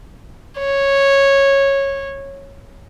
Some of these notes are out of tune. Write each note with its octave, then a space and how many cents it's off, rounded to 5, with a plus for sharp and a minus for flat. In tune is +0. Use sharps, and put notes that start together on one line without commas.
C#5 -10